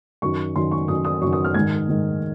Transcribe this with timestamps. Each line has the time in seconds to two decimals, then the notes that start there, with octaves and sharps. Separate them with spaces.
0.22 F#2 D#3 C#6
0.56 F#2 D#3 C6
0.71 C#6
0.88 F#2 D#3 D#6
1.05 D#6
1.21 F#2 D#3 C#6
1.33 D#6
1.45 F6
1.54 G#2 D#3 G#6
1.89 G#2 D#3